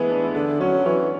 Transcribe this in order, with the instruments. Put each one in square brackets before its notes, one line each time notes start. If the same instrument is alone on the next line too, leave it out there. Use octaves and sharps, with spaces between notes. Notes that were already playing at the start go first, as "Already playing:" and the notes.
Already playing: [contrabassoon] E3 [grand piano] G#3 A3 B3 G#4 B4
[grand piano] D4
E4
[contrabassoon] D3 [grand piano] D4
[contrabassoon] F#3 [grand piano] C#4 C#5
[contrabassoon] E3 [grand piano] C#4 C#5